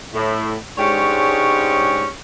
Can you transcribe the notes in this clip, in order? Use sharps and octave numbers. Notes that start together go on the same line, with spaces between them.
A2
G#2 G#3 C#4 D4 G4 C#5